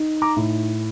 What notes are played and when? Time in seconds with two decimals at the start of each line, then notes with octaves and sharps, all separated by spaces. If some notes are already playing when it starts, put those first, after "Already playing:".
Already playing: D#4
0.22 A#5 D6
0.37 A2